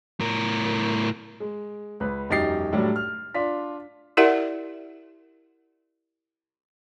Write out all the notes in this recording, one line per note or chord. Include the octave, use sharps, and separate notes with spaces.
A2 A#4
G#3
C#2 B4
E1 F#2 D#4 G4 A6 C7
A2 F#3 G3 D4
F6
D4 F4 B6
E4 G4 A#4 D5 E5 F#5